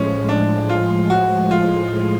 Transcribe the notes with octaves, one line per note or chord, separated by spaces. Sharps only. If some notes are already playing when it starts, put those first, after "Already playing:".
Already playing: A2 F3 G#3 C#4
D4
F4
F#4
F4